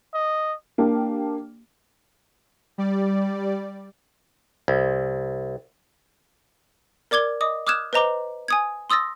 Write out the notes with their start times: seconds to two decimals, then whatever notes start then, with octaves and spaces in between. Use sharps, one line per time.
0.14 D#5
0.78 A#3 D4 G4
2.78 G3 D5
4.68 C2
7.11 A#4 D5 D6 G#6 G7
7.41 D#5 D6 D#6
7.67 D6 D#6 F6 F#6 G#6 E7
7.93 B4 C5 D#5 A#5 D6 G7
8.48 G#5 D#6 G#6
8.90 C6 D#6 E6 A6 A#6